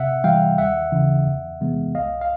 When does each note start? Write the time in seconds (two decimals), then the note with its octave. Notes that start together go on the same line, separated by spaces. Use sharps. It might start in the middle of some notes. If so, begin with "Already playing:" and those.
Already playing: C3 E5 F#5
0.24 E3 G3 F5 G5
0.58 D#2 E5 F#5
0.92 C#3 E3
1.26 E2
1.61 C3 E3 G#3 B3
1.95 C2 D#5 F5
2.21 F5